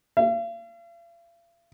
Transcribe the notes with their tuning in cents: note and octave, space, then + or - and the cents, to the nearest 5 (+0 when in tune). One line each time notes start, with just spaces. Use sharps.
F5 -45